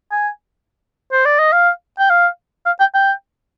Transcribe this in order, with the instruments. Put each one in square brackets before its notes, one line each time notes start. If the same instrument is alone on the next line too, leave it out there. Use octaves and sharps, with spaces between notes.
[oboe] G#5
C5
D5
D#5
F5
G5
F5
F5
G5
G5